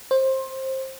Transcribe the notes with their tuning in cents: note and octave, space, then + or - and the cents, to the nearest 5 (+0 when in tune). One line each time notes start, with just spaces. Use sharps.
C5 +20